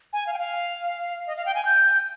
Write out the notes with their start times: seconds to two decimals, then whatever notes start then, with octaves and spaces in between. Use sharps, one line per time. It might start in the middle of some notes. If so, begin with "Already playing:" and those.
0.13 G#5
0.27 F5
0.33 G5
0.38 F5
1.27 D#5
1.36 F5
1.46 G5
1.55 G#5
1.65 G6